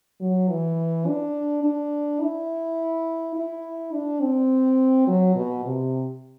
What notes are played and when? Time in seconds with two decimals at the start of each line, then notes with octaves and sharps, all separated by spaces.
0.21 F#3
0.49 E3
1.07 D4
1.64 D4
2.21 E4
3.35 E4
3.93 D4
4.22 C4
5.07 F#3
5.36 B2
5.65 C3